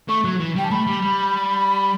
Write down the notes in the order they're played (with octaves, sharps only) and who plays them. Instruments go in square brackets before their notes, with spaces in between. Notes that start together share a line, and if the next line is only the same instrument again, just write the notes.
[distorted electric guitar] A3 [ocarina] C#6
[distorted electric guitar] F#3
E3
[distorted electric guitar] G3 [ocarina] G5
[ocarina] A5
[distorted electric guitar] A3 [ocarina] B5
[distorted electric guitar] G3
G3